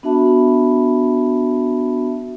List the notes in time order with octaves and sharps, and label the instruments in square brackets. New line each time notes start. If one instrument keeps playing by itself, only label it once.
[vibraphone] B3 D4 F#4 E5 A5 B5